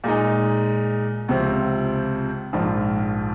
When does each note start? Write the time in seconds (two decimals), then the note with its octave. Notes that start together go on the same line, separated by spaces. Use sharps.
0.04 A#2 G#3 D#4
1.28 C#2 C3 F3 C4
2.53 A#1 G#2 F3